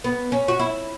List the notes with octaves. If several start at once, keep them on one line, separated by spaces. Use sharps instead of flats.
B3
C#4
F#4
E4